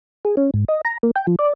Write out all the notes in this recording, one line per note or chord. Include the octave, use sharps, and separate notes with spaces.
G#4
C#4
G#2
D#5
A#5
A#3
G5
F3
D5